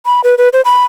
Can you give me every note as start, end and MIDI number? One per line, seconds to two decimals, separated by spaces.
0.06 0.21 83
0.24 0.35 71
0.38 0.49 71
0.53 0.61 72
0.65 0.84 83